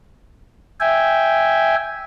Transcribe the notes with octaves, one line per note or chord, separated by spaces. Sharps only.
E5 G5 G#5